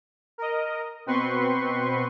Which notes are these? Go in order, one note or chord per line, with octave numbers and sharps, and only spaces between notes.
A#4 D#5
B2 C4 B4 C6 C#6